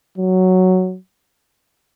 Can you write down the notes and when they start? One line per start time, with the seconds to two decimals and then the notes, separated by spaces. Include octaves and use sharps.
0.18 F#3